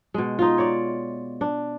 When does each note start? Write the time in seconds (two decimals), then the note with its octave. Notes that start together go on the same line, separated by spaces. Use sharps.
0.14 B2 G#3
0.39 D#4 F4
0.58 C#5 D5
1.41 D4